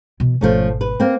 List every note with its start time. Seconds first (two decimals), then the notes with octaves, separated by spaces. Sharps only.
0.20 B2 E3
0.41 G#1 B2 F3 A3 C#4
0.81 B4
1.00 A#3 C4